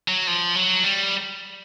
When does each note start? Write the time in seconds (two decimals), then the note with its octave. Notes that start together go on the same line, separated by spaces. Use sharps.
0.08 F#3
0.27 F3
0.56 F#3
0.84 G3